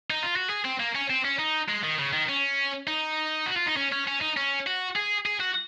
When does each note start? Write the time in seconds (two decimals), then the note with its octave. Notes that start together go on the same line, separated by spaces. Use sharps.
0.10 D#4
0.23 F4
0.36 F#4
0.49 G#4
0.65 C4
0.80 A#3
0.95 C#4
1.10 C4
1.25 C#4
1.39 D#4
1.69 G#3
1.84 D#3
1.99 C#3
2.13 D#3
2.29 C#4
2.87 D#4
3.46 F#4
3.56 F4
3.66 D#4
3.77 C#4
3.92 C#4
4.07 C#4
4.21 D#4
4.37 C#4
4.67 F#4
4.96 G#4
5.26 G#4
5.40 F#4